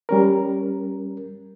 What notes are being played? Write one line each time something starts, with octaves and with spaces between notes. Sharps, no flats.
G3 C#4 A#4